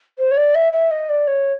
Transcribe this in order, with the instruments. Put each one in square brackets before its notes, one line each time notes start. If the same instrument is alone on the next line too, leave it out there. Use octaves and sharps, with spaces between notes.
[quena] C5
C#5
D5
E5
E5
D#5
D5
C#5